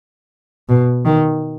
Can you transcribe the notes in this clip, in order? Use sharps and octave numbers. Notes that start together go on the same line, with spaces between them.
B2
D#3